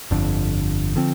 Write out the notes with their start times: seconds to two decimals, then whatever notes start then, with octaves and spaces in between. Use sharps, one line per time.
0.11 G1 F2 D3
0.96 D3 F3 C4